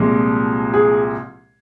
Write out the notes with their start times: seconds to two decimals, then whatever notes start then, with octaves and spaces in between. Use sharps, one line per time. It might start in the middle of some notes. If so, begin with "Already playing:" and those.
Already playing: C2 A#2 F3 G#3
0.74 G#4